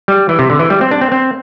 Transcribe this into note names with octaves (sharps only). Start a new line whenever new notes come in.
G3
E3
C3
D3
E3
G3
C4
D4
C4
C4